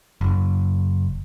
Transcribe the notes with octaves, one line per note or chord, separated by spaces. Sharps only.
F#1